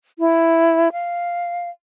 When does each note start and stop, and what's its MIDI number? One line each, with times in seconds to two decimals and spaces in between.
0.19 0.92 64
0.92 1.69 77